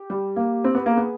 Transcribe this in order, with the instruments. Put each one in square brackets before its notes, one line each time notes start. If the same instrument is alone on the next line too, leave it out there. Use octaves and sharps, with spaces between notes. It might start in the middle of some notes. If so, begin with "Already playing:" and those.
Already playing: [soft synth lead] G4
[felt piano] G3
A#3
C4
B3
A#3
[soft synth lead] G#4
[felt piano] B3